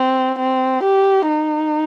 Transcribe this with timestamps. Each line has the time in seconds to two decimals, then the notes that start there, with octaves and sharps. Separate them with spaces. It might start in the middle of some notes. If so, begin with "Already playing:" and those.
Already playing: C4
0.38 C4
0.83 G4
1.28 D#4